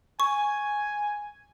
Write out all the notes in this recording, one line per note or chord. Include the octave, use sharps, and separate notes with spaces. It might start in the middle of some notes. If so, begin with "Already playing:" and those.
G#5 C#6